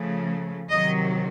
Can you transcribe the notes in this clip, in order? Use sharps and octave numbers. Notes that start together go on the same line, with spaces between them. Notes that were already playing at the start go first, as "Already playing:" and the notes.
Already playing: C#3 F3 A3
C3 D#3 F#3 D#5